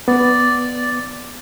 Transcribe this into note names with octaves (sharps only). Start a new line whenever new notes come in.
B3 D5